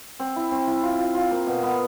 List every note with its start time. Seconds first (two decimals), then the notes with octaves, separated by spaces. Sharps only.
0.19 C4
0.36 E4
0.51 C4
0.67 E4
0.83 F4
0.99 F4
1.15 F4
1.31 A#3
1.47 B2
1.63 B3